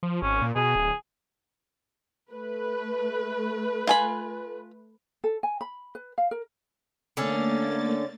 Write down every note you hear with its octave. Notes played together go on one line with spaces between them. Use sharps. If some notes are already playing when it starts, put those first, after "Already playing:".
F3
G#1 C#4
A#2
B2 G#4
D1
A3 B4
F4 G#5 B5
A4
G#5
B5
B4
F5
A#4
D3 A3 A#3 C#4 A6